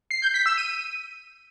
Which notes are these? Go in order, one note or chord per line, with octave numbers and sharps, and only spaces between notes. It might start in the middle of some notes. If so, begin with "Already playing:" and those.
C7
G6
B6
E6
D#7